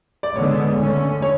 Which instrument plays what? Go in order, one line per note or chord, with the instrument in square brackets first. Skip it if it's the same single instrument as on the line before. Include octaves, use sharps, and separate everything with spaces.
[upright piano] D5
[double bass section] D3 G#3 B3 [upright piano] C#5
[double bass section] D3 A3 C#4
[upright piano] C#5